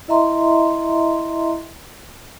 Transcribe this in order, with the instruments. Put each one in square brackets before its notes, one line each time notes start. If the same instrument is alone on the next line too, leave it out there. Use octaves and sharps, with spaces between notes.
[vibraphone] E4 D#5 E5 A#5 C6